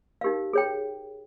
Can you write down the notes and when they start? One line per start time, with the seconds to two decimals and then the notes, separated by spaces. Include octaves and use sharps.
0.21 D#4 G4 A#4 F5
0.53 G#4 C#5 G5